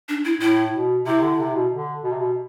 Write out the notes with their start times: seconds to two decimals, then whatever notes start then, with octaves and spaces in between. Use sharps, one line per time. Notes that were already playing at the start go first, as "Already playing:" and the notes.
0.09 D4
0.25 E4
0.41 A2 E4
0.73 B2
1.06 C3 E4
1.22 D3
1.39 C3
1.55 B2
1.72 D3
2.03 B2
2.11 C3
2.19 B2